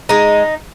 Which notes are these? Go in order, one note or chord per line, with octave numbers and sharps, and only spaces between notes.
G#3 D#4